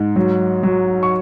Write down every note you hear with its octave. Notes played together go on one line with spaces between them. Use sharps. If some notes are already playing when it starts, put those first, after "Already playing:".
Already playing: G#2
F#3
F#3
C#6